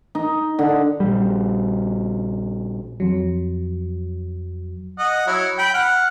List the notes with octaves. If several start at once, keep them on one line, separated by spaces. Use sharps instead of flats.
D#4
D3
A#1 G3
F2 F#3
D#5 F#5
F#3 E4 C#5
G5 B5
F#5 F6